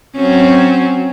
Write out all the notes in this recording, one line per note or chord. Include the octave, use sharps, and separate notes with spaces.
F#3 C4 C#4